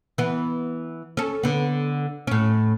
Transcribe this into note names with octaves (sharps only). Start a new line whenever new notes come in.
E3 B3
C#4 A4
D3 B3
A2 C#4